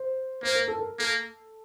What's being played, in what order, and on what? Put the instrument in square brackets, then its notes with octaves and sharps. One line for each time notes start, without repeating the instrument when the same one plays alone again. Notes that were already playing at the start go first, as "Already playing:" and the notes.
Already playing: [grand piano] C5
[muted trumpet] A#3 [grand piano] C5
[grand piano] A#4
A4
A#4
[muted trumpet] A#3 [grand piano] A4